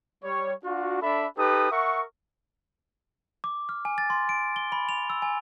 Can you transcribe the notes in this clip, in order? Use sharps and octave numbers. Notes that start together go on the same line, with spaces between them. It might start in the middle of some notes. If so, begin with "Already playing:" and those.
G3 C#5
D4 F4 F#4
D4 A4 E5 B5
D#4 G4 A4 B4 D#6
A#4 E5 F#5 C#6
D6
F6
G#5
A6
C6
D7
G7
B5
F7
E6
G#5